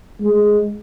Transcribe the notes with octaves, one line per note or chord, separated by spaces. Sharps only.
G#3